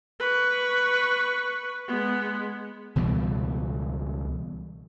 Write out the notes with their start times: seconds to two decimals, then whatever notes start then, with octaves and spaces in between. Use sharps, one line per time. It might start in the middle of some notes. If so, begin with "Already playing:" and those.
0.20 B4 C#6
1.88 G#3 B3
2.96 C#2 B2 E3 G3